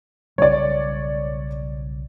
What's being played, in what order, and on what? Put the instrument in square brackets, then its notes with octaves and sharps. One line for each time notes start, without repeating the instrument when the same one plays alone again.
[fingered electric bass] B1 C#3 G3 [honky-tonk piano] C#5 D5